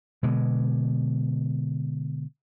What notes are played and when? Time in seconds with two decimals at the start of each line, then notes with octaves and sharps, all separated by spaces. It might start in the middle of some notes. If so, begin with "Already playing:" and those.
0.23 B2 D3 G#3